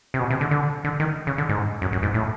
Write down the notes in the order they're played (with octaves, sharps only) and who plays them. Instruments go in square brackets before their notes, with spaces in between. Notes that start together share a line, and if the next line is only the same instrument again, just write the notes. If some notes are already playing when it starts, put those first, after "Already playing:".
[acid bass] C3
B2
C3
D3
D3
D3
D#3
C#3
D3
G#2
F#2
F#2
G#2
A2